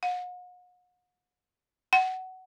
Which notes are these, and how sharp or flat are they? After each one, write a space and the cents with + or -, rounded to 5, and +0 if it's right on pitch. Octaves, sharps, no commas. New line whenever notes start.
F#5 -40
F#5 +15